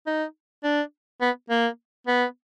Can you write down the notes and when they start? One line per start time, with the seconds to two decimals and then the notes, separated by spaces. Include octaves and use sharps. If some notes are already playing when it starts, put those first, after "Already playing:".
0.07 D#4
0.64 D4
1.21 B3
1.50 A#3
2.07 B3